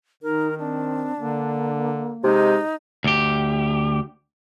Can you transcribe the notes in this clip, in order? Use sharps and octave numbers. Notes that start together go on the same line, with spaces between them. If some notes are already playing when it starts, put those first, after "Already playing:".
D#3 D#4 A#4
C4 D4
D3 A#3
C3 G#3 D#4
D2 G4